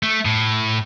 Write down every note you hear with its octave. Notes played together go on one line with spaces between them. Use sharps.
A3
A2